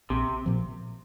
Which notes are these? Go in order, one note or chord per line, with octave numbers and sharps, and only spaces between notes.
A#1 C3
A#2 F3